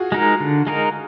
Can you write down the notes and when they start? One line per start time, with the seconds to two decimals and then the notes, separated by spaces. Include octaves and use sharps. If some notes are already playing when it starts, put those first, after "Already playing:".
Already playing: F4 F#4 G#4
0.12 G#3 D#4 A#4
0.40 D3
0.67 G#3 D#4 A#4